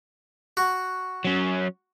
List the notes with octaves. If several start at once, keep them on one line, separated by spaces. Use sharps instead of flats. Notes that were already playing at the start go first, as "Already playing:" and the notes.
F#4
F#3 C#4